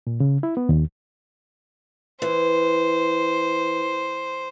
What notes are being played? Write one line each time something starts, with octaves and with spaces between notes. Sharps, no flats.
A#2
C#3
E4
B3
D#2
E3 C5